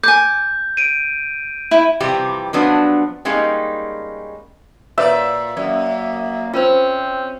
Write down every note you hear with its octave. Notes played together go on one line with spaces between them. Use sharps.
G#5 D6 G6
D7 D#7
E4
C3 E3 F3 G3 C4 G4
F3 F#3 B3 D4
G3 G#3 A#3 C#4 D#4
A#2 A#4 B4 C#5 D5 E5
F#2 A#3 D5
C4 C#4 F4 A#4 C5